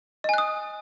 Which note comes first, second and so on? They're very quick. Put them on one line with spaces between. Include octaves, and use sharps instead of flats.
D#5 G#5 F#6 D#6